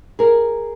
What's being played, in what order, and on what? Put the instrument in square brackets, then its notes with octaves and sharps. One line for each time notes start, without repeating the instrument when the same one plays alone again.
[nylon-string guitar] G#4 A#4